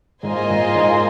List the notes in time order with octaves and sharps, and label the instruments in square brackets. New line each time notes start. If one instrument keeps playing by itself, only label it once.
[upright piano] G#2 [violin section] A#3 F4 C5 D#5 G#5
[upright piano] G#2
G#2